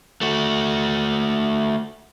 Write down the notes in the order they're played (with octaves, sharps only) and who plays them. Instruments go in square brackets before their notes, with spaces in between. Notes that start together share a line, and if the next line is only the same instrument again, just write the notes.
[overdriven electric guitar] A3 F#4